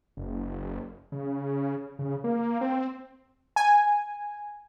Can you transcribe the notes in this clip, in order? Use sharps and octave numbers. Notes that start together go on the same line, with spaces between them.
F#1
C#3
C#3
A#3
C4
G#5